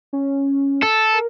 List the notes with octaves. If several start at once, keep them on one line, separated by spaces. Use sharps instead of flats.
C#4
A4
A#4